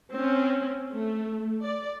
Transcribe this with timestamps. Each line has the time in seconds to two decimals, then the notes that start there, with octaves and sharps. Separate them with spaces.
0.13 C4 C#4
0.92 A3
1.63 D5